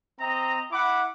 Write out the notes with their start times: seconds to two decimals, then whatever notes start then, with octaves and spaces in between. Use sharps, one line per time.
0.20 C4 D#5 A#5
0.71 E4 F#5 B5 D6